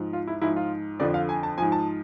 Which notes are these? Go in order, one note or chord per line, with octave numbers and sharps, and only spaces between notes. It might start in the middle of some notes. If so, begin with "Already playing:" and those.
Already playing: G#2 F3
F4
E4
G#2 F3 E4
F4
F2 D3 F3 D5
F5
G#5
A5
G#2 F3 G#5
A5